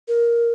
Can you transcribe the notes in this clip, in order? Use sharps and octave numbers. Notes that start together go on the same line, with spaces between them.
A#4